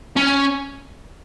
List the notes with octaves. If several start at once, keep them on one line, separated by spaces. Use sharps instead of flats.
C#4